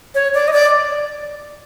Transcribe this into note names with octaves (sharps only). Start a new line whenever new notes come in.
C#5
D5
D#5
D5